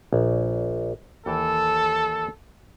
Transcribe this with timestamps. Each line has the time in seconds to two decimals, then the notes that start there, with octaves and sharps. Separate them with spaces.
0.13 A#1
1.26 D#2 E3 A4 G5